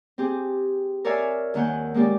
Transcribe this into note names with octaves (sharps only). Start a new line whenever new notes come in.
C4 G4 G#4
A#4 C#5 D5 E5 F5 G#5
D#2 D#3 A#3 F#5 G#5 G6
G#3 A#3 C#4 G4 D5